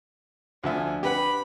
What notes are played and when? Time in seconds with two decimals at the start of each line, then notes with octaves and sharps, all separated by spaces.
0.64 D2 F3 D4 E5 G#5
1.03 G4 B4 F#5 B5